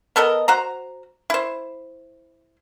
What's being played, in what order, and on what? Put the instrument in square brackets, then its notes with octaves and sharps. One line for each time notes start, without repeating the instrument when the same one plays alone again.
[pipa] B3 A4 A#4 D#5
F#4 C5 A#5
E4 C5